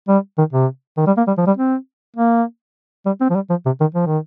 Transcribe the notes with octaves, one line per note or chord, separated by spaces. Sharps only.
G3
D#3
C3
D#3
G3
A#3
G3
F3
G3
C4
A#3
G3
C4
F3
G3
F3
C3
D#3
F3
D#3